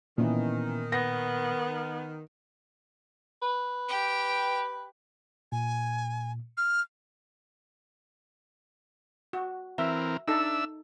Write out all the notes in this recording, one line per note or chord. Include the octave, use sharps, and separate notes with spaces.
A#2 D#3 E3 B3 C#4
B3 A#6
B4
G4 G5
A#2 G#5
F6
F#4
E3 C4 A#4 E5
D4 D#4 A4 E5 E6